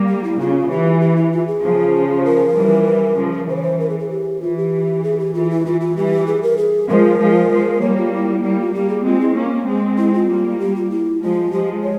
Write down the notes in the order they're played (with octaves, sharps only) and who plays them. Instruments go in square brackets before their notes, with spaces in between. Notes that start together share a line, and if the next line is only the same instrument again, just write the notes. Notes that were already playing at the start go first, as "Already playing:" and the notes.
Already playing: [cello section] G3 A#3
[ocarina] G4
E4
[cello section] C#3 [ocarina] F4
[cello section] E3 [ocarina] G4
[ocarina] G4
E4
F4
G#4
[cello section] C#3 F3
[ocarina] A#4
[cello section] E3 G3
C#3 F3
[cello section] E3 [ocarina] C5
[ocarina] C#5
C5
A#4
G#4
G#4
G4
[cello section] E3 [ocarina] F4
[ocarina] G4
G#4
G4
[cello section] E3 [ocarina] F4
[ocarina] E4
[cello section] E3 [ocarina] F4
[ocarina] F4
[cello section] E3 G3 [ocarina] G4
[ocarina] G#4
A#4
G#4
[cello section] F3 G#3 [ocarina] A#4
[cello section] F3 G#3
F3 G#3
[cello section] G3 A#3 [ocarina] C#5
[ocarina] F4
E4
[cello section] G3 A#3 [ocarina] E4
[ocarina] F4
[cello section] G3 A#3 [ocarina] G4
[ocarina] G#4
[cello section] G#3 C4 [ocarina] F4
[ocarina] E4
[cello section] A#3 C#4
G#3 C4
[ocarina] E4
F4
[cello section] G3 A#3
[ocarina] G4
F4
E4
[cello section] F3 G#3 [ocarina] F4
[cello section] F3 G#3 [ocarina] G4
[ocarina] C#5